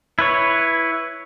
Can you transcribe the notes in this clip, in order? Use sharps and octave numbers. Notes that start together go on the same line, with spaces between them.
E4 B4 C#5